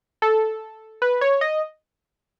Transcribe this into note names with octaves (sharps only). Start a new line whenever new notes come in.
A4
B4
C#5
D#5